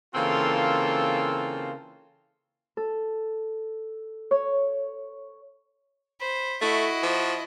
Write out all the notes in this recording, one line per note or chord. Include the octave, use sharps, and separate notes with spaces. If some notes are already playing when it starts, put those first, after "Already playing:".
C#3 E3 A#3 C4 F4 A4
A4
C#5
C5 B5
A3 E4 F#4 D#5
F3